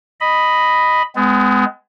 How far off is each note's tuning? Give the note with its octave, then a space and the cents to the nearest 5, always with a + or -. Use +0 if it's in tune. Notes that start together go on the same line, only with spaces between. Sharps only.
D#5 +0 B5 +0
G#3 +0 B3 +40